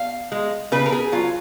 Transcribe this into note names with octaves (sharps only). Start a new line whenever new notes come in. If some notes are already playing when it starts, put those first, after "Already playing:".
Already playing: F5
G#3
C#3 B4
A#4
G#4
F#3 F4